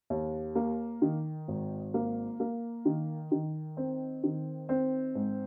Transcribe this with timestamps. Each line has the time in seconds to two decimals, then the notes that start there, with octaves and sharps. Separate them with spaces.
0.10 D#2
0.55 A#3
1.02 D#3
1.48 G#1
1.94 A#3
2.40 A#3
2.85 D#3
3.31 D#3
3.77 C4
4.23 D#3
4.69 C4
5.15 G#2